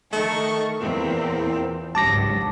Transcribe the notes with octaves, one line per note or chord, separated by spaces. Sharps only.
D#3 A3 C#6
E2 A#2 C4
G#1 C#2 G2 F#3 A5 D6 A#6